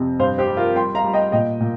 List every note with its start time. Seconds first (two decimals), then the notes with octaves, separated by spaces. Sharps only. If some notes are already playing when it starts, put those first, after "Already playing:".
Already playing: F2 C3
0.20 G2 C5 F5
0.38 G4 C5
0.48 G3
0.57 F4 A#4
0.75 G3 G5 C6
0.95 F5 A#5
1.04 G3
1.13 D#5 G5
1.32 A#2 D#5 G5
1.60 A#2